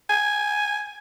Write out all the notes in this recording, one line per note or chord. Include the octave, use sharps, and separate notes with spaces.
G#5